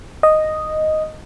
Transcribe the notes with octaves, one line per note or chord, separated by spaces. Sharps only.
D#5